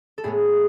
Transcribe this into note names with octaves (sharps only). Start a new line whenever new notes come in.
A4
A2 G#3 B3 E4 G#4